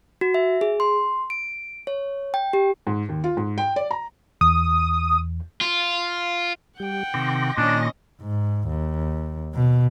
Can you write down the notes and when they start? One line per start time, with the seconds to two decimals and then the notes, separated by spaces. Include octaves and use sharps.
0.21 F#4
0.34 E5
0.61 G#4
0.80 C6
1.30 D7
1.87 C#5
2.34 G5
2.53 G4
2.87 G#2
3.09 D#2
3.24 F4
3.37 G#2
3.58 G5
3.76 D5
3.91 A#5
4.41 E2 D#6
5.61 F4
6.80 G3 G4 F#5 G5
7.14 C3 D#3 C6 D6 A#6
7.58 A#2 D#3 C#4 D4 D#5
8.21 G#2
8.68 D#2
9.54 B2